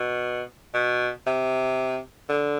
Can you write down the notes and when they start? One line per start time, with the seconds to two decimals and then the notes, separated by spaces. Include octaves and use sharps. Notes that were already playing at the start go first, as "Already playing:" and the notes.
Already playing: B2
0.74 B2
1.26 C3
2.29 D3